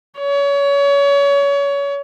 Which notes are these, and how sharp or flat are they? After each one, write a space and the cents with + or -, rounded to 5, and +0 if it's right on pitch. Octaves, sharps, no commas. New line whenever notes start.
C#5 +30